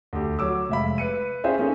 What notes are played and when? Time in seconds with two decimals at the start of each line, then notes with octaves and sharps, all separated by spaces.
0.13 D2 G4
0.39 F#3 C#5 D6 E6
0.69 F1 G#3 E5 F5 B5
0.98 B4 C#7 D#7
1.44 C#4 F4 G#4 C5 E5 G5
1.59 A#3 C4 C#4 D#4 G#4 A4